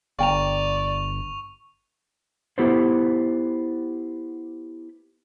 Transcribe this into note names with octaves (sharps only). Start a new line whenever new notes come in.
G1 D5 F5 G5 A#5 C#6 F7
B3 E4 G4 A4 B4 C5